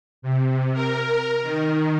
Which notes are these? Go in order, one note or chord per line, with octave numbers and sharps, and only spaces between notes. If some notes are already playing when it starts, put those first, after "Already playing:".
C3
A#4
D#3